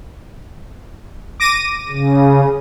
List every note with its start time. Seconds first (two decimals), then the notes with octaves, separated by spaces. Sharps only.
1.40 D6 A#6 D#7
1.89 C#3